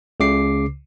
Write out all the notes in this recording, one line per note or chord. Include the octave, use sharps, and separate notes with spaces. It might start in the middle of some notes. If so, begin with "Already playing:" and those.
C#2 C#3 D6 C7